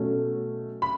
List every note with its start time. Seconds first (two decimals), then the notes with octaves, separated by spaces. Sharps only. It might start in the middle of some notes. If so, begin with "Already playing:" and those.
Already playing: B2 F#3 A3 C#4
0.82 B5